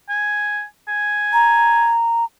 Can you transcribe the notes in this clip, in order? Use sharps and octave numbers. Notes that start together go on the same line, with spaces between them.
G#5
G#5
A#5